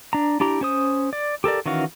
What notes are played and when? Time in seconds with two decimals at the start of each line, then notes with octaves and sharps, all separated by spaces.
0.13 D4 A#5
0.40 D4 E4 G4 A#5
0.61 C#4 C5 D#6
1.13 D5
1.44 G4 A4 A#4 D5
1.66 D#3 E3 C#4 F#4 F5